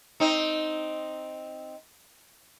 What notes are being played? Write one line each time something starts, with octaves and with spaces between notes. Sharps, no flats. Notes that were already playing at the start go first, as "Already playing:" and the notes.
C4 D#4